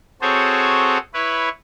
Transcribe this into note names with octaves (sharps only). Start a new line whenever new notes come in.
C4 F#4 G#4 A4 C5 C#5
E4 B4 C#5